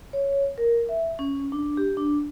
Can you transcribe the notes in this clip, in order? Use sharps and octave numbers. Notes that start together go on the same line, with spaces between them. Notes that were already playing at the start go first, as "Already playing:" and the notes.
C#5
A#4
E5
C#4
D4
G4
D4